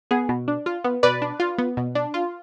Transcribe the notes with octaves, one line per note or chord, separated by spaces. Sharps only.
B3 G#4
B2
D4
F4
B3
B2 B4 D5
D4
F4
B3
B2
D4
F4